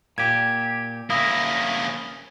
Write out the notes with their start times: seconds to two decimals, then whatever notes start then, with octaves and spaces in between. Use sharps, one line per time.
0.18 A#2 G4 G#6
1.10 A#3 C#4 E4 D#6